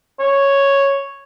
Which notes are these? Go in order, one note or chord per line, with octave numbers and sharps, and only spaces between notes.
C#5